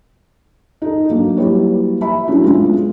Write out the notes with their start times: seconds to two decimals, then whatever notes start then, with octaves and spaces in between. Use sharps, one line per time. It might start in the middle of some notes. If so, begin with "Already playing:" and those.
0.82 D#4 A4
1.10 F#3 A#3 D4
1.37 F#3 G3 A#3 E4 B4 C#5
2.01 E5 B5
2.28 F#3 A3 C#4 D4 E4 F#4
2.44 G#3 B3 C#4 D4 F4